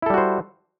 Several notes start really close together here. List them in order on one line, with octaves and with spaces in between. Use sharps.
E4 A4 G3 F#4 C5